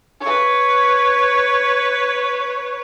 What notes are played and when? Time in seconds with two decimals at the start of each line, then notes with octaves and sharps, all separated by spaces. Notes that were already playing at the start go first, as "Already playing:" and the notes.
0.21 B4 C#5